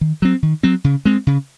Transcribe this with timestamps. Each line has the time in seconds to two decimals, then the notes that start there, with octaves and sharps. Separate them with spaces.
0.01 D#3
0.22 F#3 C4
0.43 D#3
0.63 F#3 C4
0.84 C#3
1.05 G#3 C4
1.27 C#3